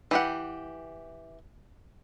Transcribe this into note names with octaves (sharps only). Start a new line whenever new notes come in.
E3 G4 F#5